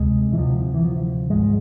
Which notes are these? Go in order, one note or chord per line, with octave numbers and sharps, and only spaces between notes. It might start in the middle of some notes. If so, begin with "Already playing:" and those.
Already playing: D2 C3 G#3
E3
D2 C3 F3
E3
F3
G#1 G#2 G#3